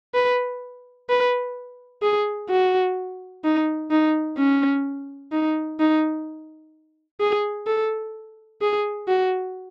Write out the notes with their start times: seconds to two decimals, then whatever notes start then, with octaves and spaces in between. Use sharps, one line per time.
0.15 B4
1.10 B4
2.02 G#4
2.50 F#4
3.44 D#4
3.91 D#4
4.38 C#4
5.32 D#4
5.80 D#4
7.21 G#4
7.67 A4
8.62 G#4
9.08 F#4